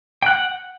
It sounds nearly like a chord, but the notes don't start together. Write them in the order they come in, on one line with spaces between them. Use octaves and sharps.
G5 F#6 F#5